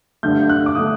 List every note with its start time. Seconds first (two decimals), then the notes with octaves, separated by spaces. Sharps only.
0.23 G2 D3 A3 G6
0.49 F#6
0.66 D6
0.75 D3 A3 D#6